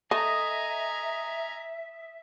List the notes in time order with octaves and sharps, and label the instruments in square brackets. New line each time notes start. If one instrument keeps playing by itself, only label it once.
[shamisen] A3 [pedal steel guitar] D#5 [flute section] E5 [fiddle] G#5 A#5